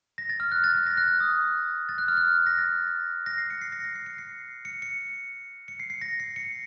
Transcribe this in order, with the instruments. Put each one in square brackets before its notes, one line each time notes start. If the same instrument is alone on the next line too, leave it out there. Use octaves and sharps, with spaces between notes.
[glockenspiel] A#6
A6
F6
F#6
A6
A6
A#6
F#6
D#6
A6
F#6
F6
F#6
A#6
A6
A#6
C7
C#7
C7
A#6
C7
C7
C#7
C7
C#7
C#7
C#7
C7
C7
A#6
C7
C#7